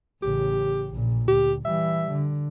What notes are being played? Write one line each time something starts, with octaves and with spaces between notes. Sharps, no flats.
A1 C#3 G4
A#1 A#2
D2 G4
E3 G3 E5
D3